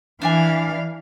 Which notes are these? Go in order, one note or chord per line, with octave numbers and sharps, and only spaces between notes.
E3 D4 D5 F5 G#5